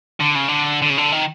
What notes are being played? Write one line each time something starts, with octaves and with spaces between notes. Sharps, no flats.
D3
C#3
D3
D3
C#3
D3
D#3